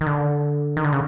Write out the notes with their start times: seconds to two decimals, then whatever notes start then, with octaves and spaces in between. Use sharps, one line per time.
0.01 D#3
0.06 D3
0.77 D#3
0.84 D3
0.93 C#3